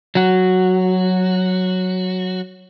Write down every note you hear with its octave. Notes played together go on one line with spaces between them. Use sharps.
F#3 F#4